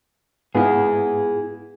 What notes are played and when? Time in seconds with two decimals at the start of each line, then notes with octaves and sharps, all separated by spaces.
0.55 G#2 B3 E4 F4 G#4